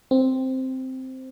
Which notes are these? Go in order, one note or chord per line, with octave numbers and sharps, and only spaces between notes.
C4